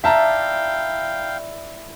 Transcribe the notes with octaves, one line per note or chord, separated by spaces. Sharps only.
E4 D5 E5 F5 G5 A5 A#5